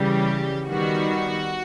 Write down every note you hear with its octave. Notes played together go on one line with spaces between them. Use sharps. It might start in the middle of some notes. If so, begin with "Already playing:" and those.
Already playing: C#3 E3 G3 G4
D#3 G3 B3 F#4